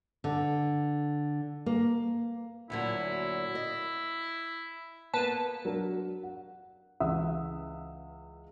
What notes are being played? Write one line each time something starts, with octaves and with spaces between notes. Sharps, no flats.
D3
A#3
D2 A#2 F#3 E4
D#5
A#3 B3 B4 A5
F#3 D4 A#4
F#5
C#2 E3 E5 F#5 D#6 E6